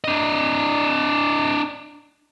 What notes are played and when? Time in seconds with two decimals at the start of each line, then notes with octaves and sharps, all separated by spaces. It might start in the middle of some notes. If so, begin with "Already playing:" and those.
0.04 D4 D#5